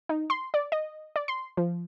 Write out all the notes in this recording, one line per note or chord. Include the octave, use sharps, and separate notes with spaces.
D#4
C6
D5
D#5
D5
C6
F3